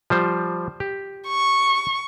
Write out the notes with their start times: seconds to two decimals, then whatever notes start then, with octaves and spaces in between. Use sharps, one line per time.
0.10 F3 G3 C5
0.80 G4
1.28 C#6